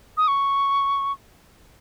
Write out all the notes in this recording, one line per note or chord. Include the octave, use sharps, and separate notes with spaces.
D#6
C#6